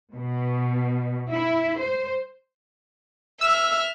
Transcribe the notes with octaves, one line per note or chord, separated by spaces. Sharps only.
B2
E4
C5
E5 E6 F6